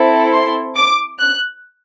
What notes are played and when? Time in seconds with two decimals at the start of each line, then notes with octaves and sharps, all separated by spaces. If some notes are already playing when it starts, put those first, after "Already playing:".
Already playing: C4 E4 A4
0.32 C6
0.76 D6
1.19 F#6